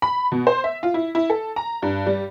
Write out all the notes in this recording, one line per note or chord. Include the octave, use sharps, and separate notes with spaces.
B5
B2
C5
E5
F4
E4
E4
A4
A#5
G2
G3